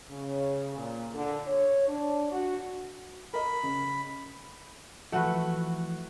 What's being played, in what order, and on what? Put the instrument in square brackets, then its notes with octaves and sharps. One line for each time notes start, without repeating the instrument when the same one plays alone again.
[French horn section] C#3
A#2
D3
C#5
D4
F#4
[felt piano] A#4 D#5 [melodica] B5
[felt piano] C#3
[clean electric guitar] E3 F3 [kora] A3 F#4 B4 [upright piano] F#5